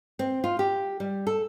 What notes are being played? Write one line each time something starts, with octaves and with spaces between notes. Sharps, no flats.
C4
F4
G4
G3
A4